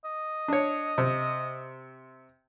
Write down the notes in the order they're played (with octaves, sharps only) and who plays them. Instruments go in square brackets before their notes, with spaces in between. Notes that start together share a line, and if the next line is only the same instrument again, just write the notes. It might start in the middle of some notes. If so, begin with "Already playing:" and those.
[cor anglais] D#5
[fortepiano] D4 C#5
C3